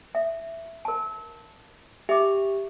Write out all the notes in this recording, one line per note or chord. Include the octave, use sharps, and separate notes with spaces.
E5
A#4 A5
G4 E5 D6